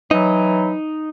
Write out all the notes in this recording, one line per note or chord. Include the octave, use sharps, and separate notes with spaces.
E3 F#3 D#4